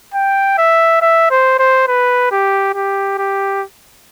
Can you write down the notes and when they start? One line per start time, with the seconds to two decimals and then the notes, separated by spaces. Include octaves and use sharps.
0.14 G5
0.58 E5
1.02 E5
1.31 C5
1.59 C5
1.88 B4
2.32 G4
2.74 G4
3.18 G4